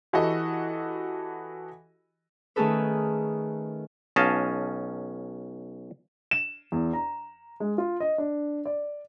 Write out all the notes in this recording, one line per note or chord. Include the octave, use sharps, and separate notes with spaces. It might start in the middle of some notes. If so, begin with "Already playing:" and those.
E3 F#4 G4 A4 D#5
D#3 A3 C#4 G#4 A4 B4
B1 C#4 D#5 F5 A5
E7
E2
A#5
G#3
F4
D#5
D4
D5